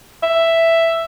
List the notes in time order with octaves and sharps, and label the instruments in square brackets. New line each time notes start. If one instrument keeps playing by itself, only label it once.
[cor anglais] E5